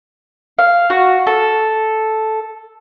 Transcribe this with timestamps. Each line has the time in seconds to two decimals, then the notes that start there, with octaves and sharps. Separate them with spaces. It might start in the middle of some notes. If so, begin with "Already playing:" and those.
0.59 F5
0.90 F#4
1.27 A4